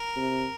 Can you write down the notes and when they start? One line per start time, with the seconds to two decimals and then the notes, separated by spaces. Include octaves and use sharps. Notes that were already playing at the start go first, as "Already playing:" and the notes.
Already playing: A#4
0.16 C3